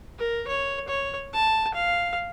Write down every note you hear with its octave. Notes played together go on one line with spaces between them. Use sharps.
A#4
C#5
C#5
A5
F5